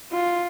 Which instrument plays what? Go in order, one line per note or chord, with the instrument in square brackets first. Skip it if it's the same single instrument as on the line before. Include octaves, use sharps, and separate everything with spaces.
[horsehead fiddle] F4